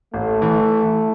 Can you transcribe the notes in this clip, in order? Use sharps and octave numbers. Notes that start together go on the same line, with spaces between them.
A1 A3
E3